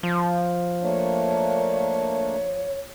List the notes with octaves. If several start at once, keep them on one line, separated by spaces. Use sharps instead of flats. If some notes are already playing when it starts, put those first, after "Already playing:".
F3
A3 A#3 D4 C#5